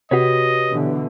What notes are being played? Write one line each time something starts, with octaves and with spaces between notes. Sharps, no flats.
C3 F#4 G4 B4 C#5 D#5
B2 D3 E3